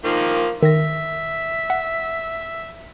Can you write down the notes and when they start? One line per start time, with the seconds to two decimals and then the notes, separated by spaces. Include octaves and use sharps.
0.05 D#3 F3 A#3
0.62 D#3 E5 A#6
1.70 F#5